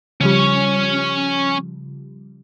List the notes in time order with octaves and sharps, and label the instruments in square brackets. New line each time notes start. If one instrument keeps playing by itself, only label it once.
[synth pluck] C#3 F3 G3 [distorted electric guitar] C#4 C#5